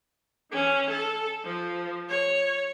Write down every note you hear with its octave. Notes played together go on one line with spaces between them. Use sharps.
E3 C#4
A4
F3
C#5